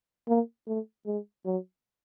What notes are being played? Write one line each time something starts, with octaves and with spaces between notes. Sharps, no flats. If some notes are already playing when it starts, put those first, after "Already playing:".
A#3
A3
G#3
F#3